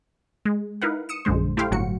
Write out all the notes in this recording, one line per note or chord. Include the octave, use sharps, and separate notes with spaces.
G#3
D#4 E4 A#4 B4 F5 F#5
D#6 C#7 E7
A#1 F#2 D3 G#3 C5
A3 E4 G4 C5 F5 G5
G1 A2 F#3 F#4 C#7